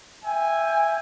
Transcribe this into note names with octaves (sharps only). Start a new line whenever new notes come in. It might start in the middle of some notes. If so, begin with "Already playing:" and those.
E5 G5 G#5